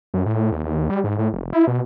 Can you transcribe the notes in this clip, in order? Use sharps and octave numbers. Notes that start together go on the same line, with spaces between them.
F#2
A2
D#2
D#2
G3
G#2
A2
F1
E4
B2